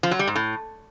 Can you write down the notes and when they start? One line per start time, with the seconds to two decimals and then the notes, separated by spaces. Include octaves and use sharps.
0.03 F3
0.11 F#3
0.19 G3
0.27 G#2
0.36 A2